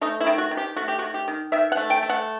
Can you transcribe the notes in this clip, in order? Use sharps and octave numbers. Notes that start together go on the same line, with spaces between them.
A3 D#4
E4
D#3
F#4
D#3
G4
A3 F#4
G4
F#4
D#3
G4
D#3
D#3 E5
F#5
A3
G5
A3
F#5